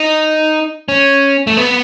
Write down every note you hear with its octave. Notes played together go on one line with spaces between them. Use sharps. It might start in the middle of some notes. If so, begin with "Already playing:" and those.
Already playing: D#4
C#4
A3
B3